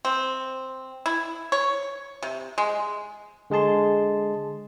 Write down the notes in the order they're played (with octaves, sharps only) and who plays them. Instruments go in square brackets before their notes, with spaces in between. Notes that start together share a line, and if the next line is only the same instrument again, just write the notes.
[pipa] C4
E4
C#5
C3
G#3
[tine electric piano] D3 G#3 G#4 A5 C6